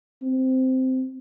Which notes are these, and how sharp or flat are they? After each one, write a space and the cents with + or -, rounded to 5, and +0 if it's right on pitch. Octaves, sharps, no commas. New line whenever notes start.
C4 -10